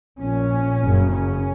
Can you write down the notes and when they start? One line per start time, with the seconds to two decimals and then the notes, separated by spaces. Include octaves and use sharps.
0.19 A#1 A#2 C#4
0.82 F#1 F#2 C#3
1.12 C#4